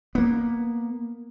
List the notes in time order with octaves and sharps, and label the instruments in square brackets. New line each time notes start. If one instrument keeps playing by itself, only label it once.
[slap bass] A#3 B3